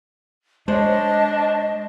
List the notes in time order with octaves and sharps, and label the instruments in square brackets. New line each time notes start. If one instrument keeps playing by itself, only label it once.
[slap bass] G#3 [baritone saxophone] D4 [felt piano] C5 C#5 [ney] D#5